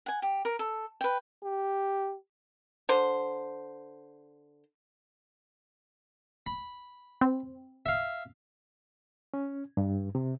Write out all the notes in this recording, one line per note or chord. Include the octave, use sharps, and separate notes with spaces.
F#5 G#5
G4
A#4
A4
B4 G5
G4
D3 C5
B5
C4
E5 F5
C#4
G2
C3